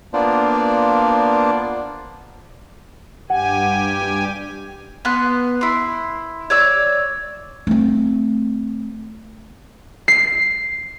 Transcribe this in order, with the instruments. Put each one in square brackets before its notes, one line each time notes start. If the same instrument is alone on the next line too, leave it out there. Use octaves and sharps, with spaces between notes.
[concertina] A#3 B3 D4 F4 C5 D5
[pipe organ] G2 G4 G#5 [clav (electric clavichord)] F#5
[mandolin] B3 C6 F#6
E4 C6
C#5 D5 E6
[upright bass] A3 C4
[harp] C7